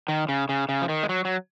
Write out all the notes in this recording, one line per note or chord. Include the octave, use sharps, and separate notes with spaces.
D#3
C#3
C#3
C#3
F3
D#3
G#3
F#3
F#3